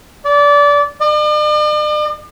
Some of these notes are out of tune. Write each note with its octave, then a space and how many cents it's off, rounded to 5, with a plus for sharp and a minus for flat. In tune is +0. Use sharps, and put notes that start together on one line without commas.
D5 -25
D5 +45